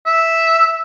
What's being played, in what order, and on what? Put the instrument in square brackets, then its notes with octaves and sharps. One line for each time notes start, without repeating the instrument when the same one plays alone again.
[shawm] E5